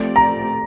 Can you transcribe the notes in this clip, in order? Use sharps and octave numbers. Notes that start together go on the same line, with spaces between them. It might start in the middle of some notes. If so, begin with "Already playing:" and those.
Already playing: F3 A3 C4 G4 D5
A#5